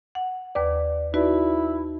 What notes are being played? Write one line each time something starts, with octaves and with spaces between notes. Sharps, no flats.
F#5
D#2 B4 D5 D6
D#4 E4 F#4 B4 D5